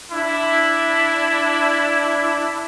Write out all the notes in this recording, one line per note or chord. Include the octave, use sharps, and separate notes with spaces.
D4 E4